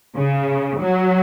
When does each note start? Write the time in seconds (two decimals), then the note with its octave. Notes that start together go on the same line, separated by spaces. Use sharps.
0.16 C#3
0.80 F#3